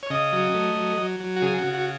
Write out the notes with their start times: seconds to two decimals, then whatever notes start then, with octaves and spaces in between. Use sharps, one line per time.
0.03 C#5
0.10 C#3 D#5
0.33 F#3
0.54 A3
0.77 F#3
0.98 F#3
1.20 F#3
1.36 F#4
1.42 C#3 G#4
1.58 C#3 F#4
1.74 F#4